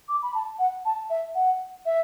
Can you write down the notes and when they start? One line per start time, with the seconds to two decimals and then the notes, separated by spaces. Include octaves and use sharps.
0.09 D6
0.23 B5
0.35 A5
0.59 F#5
0.85 A5
1.10 E5
1.35 F#5
1.86 E5